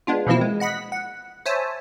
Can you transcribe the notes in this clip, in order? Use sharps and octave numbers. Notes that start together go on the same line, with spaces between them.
G#3 B3 D4 F4
B2 E3 F3 A#3 C4 E4
G#3
D#5 F#5 B5 B6
F#5
C5 C#5 E5 G#5 A5